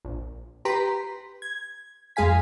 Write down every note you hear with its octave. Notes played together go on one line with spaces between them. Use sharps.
A#1
G4 B4 A#5 C6 B6
G#6
F2 G#3 G#4 F5 G#5 B6